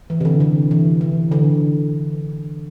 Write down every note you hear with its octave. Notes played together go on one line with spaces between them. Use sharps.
E3
C3
D3
D3
E3
E3
D3